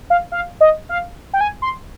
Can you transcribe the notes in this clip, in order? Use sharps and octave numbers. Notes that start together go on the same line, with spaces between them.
F5
F5
D#5
F5
G5
G#5
C6